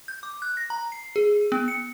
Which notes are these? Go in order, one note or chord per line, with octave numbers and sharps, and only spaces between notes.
G6
D6
F#6
A#6
A#5
C7
G#4
B3
C#7